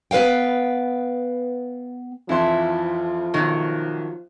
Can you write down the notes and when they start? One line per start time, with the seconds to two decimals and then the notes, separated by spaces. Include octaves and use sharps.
0.11 B3 B4 C5 F5 G5
2.29 F2 E3 F3 E4 E5 A5 C6
3.34 B1 D#3 F#3